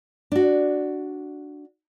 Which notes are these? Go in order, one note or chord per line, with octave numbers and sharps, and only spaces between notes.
D4 F#4